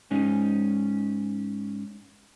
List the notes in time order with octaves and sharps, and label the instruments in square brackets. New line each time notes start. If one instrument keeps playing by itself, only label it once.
[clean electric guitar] G#2 G#3 C#4 D#4